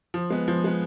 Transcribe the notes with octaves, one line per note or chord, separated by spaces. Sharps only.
F3
G#3 B3
F3
G#3 B3